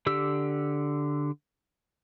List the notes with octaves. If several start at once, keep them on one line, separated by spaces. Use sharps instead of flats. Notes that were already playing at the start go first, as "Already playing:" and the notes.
D3 G4 E6